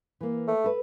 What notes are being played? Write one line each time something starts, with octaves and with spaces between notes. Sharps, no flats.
E3 A#3
A3
A4 B4